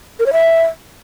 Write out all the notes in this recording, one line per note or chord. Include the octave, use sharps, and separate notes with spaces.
A#4
C#5
E5